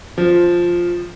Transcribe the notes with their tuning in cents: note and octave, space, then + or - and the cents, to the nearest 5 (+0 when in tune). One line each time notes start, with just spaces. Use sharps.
F3 +0